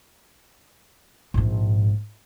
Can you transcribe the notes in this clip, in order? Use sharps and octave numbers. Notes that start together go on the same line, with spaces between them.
A#1 G#2